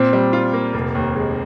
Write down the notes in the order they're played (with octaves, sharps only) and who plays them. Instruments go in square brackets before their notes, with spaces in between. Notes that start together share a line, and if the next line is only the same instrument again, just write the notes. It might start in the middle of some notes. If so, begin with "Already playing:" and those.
Already playing: [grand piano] A#2 [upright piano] C4
[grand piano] G3
F4
A#3
F1
D#2
G#3